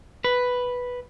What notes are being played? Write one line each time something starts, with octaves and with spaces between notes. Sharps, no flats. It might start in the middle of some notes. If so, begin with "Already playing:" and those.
B4